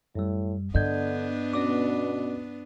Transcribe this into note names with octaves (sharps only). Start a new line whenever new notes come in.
F#2 A2 G3
G2 D3 B3 D4 D#5 G6 G#6
B2 C#4 D5 D6